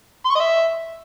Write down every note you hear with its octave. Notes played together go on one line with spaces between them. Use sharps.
C6
C#6
D#5
E5